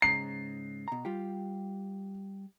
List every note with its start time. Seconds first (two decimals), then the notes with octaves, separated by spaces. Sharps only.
0.02 G#2 C#3 A#5 C7
0.88 B2 A#5
1.05 G3 F4 G4